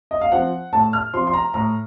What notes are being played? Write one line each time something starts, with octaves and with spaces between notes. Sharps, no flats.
D#5
F5
F3 C4 F#5
A2 A5
F6
F3 C4 C6
C6
A#5
A2 A#5